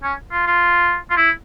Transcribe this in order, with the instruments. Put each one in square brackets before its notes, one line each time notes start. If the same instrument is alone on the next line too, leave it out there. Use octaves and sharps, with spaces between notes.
[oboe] C#4
F4
F4
F4
E4